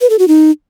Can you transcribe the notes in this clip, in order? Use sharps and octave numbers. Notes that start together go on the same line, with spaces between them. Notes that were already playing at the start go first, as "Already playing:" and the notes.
B4
A4
F#4
D#4